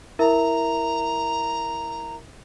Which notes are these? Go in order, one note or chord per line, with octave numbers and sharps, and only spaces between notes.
E4 A#4 E5 A#5